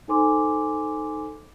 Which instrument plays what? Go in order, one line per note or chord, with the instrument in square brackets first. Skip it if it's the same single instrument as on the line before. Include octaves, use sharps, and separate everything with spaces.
[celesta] D#4 A4 C5 G#5 C6 D6